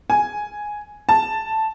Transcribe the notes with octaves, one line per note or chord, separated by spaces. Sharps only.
G#5
A5